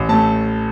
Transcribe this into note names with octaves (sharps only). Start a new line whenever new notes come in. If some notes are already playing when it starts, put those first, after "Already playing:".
Already playing: A1
A2 A3 A5